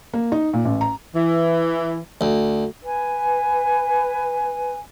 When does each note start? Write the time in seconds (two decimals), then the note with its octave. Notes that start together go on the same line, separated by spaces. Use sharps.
0.14 A#3
0.32 D#4
0.53 A#2
0.65 A1
0.81 A#5
1.14 E3
2.21 D2
2.84 B4 G#5